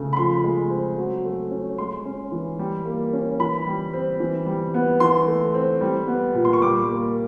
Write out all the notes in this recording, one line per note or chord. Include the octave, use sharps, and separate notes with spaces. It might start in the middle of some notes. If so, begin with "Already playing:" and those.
Already playing: C#3 A3
B5
F3 C6
G#3
C4
F#3
A3
C#4
G#3 C6
C#4
E3
G3
A#3
C#4
E3 B5
G3
C4
E3
G3
B3
E3 C6
A3
C4
G3
B3
A#2
C6
C#6
G3 D6
A#3